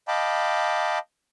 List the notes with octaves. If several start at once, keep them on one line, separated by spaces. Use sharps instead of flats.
D#5 F5 G5 A5 B5 D6